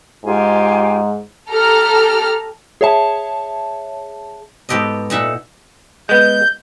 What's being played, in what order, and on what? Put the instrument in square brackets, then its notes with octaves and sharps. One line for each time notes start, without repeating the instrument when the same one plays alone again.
[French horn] G#2 [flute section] F4 G4 G#5
[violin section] G4 A4 A#5 F6
[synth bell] G#4 C#5 E5 A5
[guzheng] G#2 B3 G4 A4 D#5
A#2 D#4 E5 F#5
[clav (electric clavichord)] G#3 B3 [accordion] G6